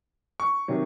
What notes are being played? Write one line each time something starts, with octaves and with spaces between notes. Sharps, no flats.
C#6
C3 D#3 F#3